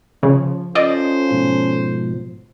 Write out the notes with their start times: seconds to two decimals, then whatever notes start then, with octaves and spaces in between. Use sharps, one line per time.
0.23 C#3 F3
0.75 C#4 F4 A4 C5 D5 D#5
1.31 G#2 B2 F3